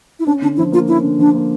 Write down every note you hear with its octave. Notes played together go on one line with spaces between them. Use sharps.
E4
C#4 D4
D3 D4
F3 E4
A#3 F4
C#4 E4
D3
F3 D4
A#3